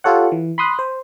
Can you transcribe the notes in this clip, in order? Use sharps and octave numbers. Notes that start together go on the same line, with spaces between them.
F4 G4 A4 C#5 F#5
E3
B5 C6 D#6 F#6
C5